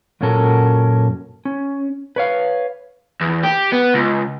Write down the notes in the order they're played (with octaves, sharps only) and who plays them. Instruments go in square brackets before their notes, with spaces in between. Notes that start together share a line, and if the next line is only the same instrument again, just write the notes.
[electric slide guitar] F#2 A#2 F#3 C#4 A4 A#4
C#4
B4 C#5 F5
[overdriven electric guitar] E2
G4
B3
C#2